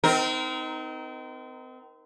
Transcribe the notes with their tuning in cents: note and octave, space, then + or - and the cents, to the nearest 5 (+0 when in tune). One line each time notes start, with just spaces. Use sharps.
C4 -35 D#4 +10 A#4 +0